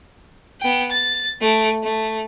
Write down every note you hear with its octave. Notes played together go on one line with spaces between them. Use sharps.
B3 G5
A6
A3 D7
A3